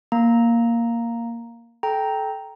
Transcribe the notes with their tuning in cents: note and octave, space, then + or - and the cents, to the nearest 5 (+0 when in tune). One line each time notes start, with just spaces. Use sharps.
A#3 +0 A#5 +0
A4 -25 G5 +0 A#5 +0